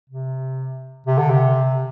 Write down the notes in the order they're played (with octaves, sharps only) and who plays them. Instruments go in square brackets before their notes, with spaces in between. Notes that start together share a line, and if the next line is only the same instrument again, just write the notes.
[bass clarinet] C3
C3
D3
C3